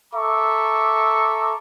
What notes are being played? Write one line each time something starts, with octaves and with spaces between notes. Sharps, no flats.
A4 E5 A#5 C#6 D6